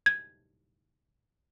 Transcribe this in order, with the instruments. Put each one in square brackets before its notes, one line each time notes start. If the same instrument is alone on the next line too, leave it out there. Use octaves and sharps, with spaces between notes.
[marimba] G#6